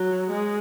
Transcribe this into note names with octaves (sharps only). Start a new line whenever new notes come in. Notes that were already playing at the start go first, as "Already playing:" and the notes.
Already playing: F#3
G#3